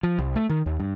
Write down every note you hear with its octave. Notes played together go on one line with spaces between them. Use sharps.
F3
C2
A3
D#3
D#2
G2